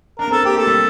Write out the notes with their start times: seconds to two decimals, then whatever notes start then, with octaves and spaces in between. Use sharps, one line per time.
0.19 D4 A#4
0.26 A#3
0.31 C4 A4
0.44 A#3 G4
0.55 A3 A4
0.67 G3